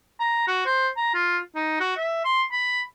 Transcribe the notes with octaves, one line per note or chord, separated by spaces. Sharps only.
A#5
F#4
C5
A#5
F4
D#4
F#4
E5
C6
B5